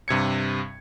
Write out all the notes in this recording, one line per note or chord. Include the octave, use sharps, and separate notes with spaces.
G2 C3 G#6 C#7